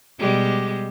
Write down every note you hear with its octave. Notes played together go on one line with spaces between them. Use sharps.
B2 G3 G#3